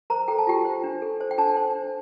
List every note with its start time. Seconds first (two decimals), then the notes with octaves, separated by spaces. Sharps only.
0.10 A#4 C5 A#5
0.28 A4 G5
0.38 A5
0.47 F4 G4 G5
0.65 C5
0.84 D4
1.02 A4
1.21 C5
1.31 G5
1.38 D4 A4 A5
1.56 C5
1.75 D4